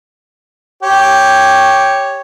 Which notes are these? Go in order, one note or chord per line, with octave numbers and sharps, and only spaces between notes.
G4 C#5